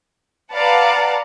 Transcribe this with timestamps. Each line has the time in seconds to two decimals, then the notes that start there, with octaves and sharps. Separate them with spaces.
0.54 B4 D5 F5 F#5 A5 A#5